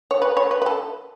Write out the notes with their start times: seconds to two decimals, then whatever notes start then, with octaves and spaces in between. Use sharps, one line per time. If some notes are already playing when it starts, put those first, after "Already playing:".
0.11 C#5
0.22 B4
0.37 C#5
0.51 B4
0.62 B4
0.66 A4